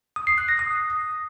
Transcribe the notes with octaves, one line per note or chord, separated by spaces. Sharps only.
D#6
C7
F#6
A#6
D#6